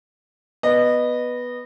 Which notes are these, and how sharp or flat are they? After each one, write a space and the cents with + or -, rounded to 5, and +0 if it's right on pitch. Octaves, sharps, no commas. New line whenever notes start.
B3 -5 D#5 -20